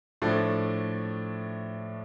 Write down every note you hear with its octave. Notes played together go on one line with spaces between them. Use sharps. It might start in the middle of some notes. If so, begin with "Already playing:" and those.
A2 F3 A3 D4